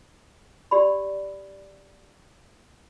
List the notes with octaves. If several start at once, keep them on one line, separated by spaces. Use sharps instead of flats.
G4 D5 B5